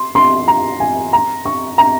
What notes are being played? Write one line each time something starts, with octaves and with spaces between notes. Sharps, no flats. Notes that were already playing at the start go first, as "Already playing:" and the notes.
Already playing: C6
C6
A#5
G#5
A#5
C#6
A#5